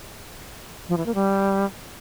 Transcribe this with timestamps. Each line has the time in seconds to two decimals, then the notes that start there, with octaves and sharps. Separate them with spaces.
0.89 F3
0.97 E3
1.06 A#3
1.15 G3